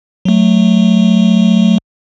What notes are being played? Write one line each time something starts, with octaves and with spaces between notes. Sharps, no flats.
F#3 A3